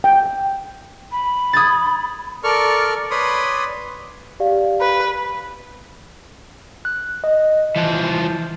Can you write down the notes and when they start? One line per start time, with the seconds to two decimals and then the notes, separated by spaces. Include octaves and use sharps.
0.04 G5
1.12 B5
1.53 D#6 G#6 A6
2.44 A4 A#4 D5 C#6 F6
3.11 B4 C#5 D5 B5 C6 D#6
4.40 G4 D5 F5
4.81 B4
6.85 F#6
7.24 D#5
7.76 E3 F3